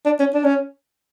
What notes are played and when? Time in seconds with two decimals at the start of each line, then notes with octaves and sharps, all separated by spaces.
0.06 D4
0.20 C#4
0.34 D4
0.44 C#4